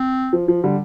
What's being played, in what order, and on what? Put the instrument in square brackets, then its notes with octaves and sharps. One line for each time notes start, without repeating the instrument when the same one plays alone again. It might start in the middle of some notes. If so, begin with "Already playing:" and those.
Already playing: [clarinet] C4
[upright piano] F3
F3
D3 G3